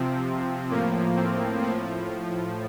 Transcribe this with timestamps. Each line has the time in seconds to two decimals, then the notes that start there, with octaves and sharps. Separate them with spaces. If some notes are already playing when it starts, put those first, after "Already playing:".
Already playing: C3 F3 C4
0.71 A2 F3 A#3
1.17 C4
1.62 A2 F3